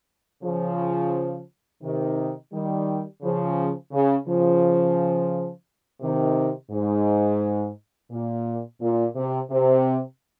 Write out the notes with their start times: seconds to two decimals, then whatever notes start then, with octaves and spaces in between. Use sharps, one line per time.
0.43 C#3 F3
1.83 C3 D#3
2.52 D#3 G3
3.22 C#3 F3
3.92 C#3
4.27 C#3 F3
6.01 C3 D#3
6.71 G#2
8.10 A#2
8.81 A#2
9.15 C3
9.50 C3